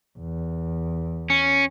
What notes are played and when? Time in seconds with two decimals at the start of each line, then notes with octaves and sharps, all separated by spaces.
0.19 E2
1.30 C#4